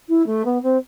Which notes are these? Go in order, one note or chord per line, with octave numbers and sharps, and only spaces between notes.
E4
A3
B3
C4